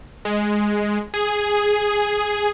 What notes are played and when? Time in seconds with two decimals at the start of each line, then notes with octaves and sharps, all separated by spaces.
0.25 G#3
1.14 G#4